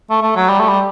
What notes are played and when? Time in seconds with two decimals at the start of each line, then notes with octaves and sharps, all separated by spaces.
0.10 A3
0.22 A3
0.36 F#3
0.49 G3
0.60 A3
0.69 G3